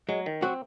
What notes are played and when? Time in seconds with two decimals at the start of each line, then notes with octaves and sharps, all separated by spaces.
0.09 F#3 G#3
0.26 D#3
0.42 F#3 C4 F#4